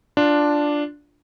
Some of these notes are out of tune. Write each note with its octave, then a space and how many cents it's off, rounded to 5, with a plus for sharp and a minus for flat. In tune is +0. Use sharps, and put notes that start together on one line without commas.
D4 +0 F4 +0